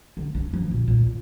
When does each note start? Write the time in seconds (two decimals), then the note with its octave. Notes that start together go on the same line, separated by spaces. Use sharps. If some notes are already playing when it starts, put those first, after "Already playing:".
0.17 D3
0.35 D#4
0.54 F3
0.71 A#2
0.88 A#2